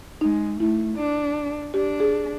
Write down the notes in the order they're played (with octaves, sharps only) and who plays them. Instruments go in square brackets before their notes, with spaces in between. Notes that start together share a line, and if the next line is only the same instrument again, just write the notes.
[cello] G#3 [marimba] D#4
[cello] A3 [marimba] E4
[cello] D4
[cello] D4 [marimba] G4
[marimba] G#4